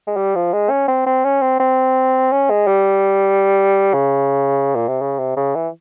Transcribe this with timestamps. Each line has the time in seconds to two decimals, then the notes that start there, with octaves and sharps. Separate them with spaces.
0.07 G#3
0.16 G3
0.35 F3
0.53 G#3
0.70 C#4
0.88 C4
1.06 C4
1.25 C#4
1.42 C4
1.60 C4
2.32 C#4
2.50 G#3
2.67 G3
3.93 C#3
4.75 A#2
4.88 C3
5.01 C#3
5.19 C3
5.36 C#3
5.55 E3